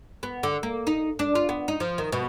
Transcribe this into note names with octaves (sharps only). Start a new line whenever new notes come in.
B3
D3
A#3
D#4
D4
F4
B3
D#4
F3
D#3
B2